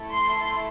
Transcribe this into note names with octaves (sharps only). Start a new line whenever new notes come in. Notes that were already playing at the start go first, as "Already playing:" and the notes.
Already playing: A3 E4 A4
C6